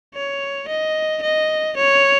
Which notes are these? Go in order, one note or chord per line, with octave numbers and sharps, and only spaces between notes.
C#5
D#5
D#5
C#5